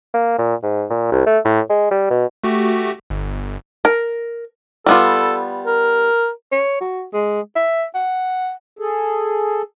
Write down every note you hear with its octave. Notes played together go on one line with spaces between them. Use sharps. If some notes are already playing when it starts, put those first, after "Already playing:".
A#3
A#2
G#2
A#2
C2
A3
A2
G#3
G3
B2
A3 F#4 G4
G1
A#4
G3 B3 F4 A4
A#4
C#5
F#4
G#3
E5
F#5
G#4 A4